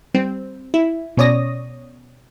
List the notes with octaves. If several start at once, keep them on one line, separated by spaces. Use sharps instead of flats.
G3 C4
E4
B2 C#4 C#5 D5 D#6 A#6